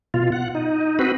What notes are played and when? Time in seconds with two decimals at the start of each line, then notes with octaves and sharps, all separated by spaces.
0.14 B2 F4
0.32 F#5
0.55 D#4
0.99 C4 F#4 B4